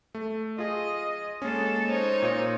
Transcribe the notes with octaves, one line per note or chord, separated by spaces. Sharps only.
A3
F4 G#4 D#5
G#3 A#3 C#4 A4
D#4 C5 C#5
A#2 F4